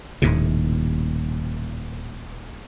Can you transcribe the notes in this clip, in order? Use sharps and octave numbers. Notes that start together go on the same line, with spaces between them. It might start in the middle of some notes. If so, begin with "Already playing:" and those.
D#1 D#2 A2 C3